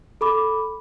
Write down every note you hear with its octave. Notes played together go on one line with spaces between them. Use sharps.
A4 B5 D6